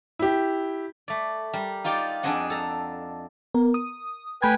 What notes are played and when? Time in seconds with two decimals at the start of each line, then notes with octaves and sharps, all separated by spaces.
0.19 E4 G4
1.08 A3 D5
1.53 G3 A#4
1.84 D#4 F4 G4 D5 G5
2.23 F2 D4 G#4 C5 D#5 F#5
2.50 A4 A#5
3.54 B3 A#4
3.74 D#6
4.42 A3 B4 G5 G#5 B5 G#6